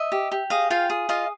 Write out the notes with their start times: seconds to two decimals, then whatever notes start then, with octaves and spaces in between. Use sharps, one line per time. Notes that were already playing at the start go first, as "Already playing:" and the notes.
Already playing: D#5 E5
0.12 G4
0.32 G4
0.50 G#4 D#5 F5
0.70 F4 F5 G5
0.90 G#4
1.09 F4 D#5 F5